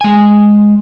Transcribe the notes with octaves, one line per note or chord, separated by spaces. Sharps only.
G#3 G#5